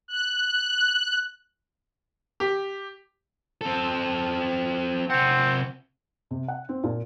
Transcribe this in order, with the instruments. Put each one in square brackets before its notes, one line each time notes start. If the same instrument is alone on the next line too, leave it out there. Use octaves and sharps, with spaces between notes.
[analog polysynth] F#6
[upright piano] G4
[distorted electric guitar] C4 A4
[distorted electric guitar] C3 F#5 [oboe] C4
[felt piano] C3
F#5
C4
A#2